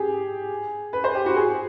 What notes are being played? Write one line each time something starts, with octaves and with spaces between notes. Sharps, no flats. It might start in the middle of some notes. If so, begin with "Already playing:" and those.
Already playing: G4 G#4
B4
C5
G4
F#4
G#4